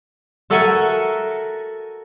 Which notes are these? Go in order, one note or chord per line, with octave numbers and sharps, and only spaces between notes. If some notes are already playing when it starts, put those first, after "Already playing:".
F#4 A4 A#4 E5 F#5 G#5